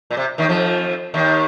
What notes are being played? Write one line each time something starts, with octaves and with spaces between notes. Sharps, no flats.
A#2
C3
D#2 D#3
F2 F3
D#2 D#3